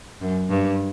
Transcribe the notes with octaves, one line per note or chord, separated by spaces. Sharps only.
F#2
G2